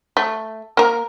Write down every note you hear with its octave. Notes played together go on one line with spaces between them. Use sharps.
A3
A#3 A#4